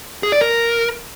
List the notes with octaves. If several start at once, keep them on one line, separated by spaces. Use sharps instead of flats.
G#4
D5
A#4